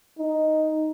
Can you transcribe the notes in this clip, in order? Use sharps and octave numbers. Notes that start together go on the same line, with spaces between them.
D#4